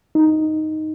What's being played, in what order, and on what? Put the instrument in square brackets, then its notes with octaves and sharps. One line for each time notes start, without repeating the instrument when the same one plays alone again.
[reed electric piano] D#4